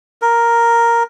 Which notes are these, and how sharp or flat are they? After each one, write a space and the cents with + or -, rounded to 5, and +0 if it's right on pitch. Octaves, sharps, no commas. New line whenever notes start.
A#4 +0